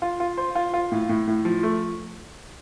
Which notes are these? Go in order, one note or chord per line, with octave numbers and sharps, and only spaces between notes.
F4
F4
C5
F4
F4
A2
A2
A2
F3
A3